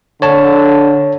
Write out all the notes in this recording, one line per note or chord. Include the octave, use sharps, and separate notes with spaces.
D3 C#5 A5